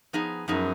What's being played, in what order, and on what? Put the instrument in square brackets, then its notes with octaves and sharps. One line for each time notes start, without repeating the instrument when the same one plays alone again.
[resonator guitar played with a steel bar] F3 B3 D#4 G#4
[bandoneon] F#2 [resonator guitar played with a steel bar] F3 B3 D#4 G#4